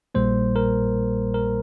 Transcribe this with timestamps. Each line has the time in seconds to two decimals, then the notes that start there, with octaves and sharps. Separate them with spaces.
0.15 A#1 A#2 G3 A#3 C5
0.56 A#4
1.34 A#4